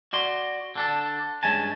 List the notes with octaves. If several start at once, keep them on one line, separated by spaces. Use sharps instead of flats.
F#4 D5 C6
D3 D4 A4
G2 G#3 C#4 G#5 A5